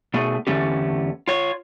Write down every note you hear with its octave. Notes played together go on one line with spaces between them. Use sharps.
B2 A3 G#4
E2 D3 A3 C#4 G4
F4 C#5